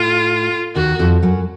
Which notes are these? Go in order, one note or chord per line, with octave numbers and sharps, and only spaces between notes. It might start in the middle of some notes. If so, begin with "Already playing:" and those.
Already playing: A2 F4
D#2 D#3 F#4
F2 F3
F#2 F#3